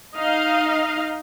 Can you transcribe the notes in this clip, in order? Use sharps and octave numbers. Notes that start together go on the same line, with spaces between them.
D#4 D#5 F5